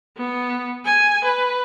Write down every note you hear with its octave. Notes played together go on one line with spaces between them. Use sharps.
B3
G#5
B4